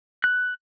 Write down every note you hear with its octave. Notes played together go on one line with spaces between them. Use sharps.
F#6